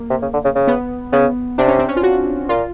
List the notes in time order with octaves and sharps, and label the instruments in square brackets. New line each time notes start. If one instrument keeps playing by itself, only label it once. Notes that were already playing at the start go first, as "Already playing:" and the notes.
Already playing: [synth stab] A#3
[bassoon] C3
C#3
D3
C#3
C#3
[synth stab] B3
[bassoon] C#3 [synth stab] B3
[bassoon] C3 [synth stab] D4
[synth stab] C#4
C4
C#4
F4
F#4
[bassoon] A#2 [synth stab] F4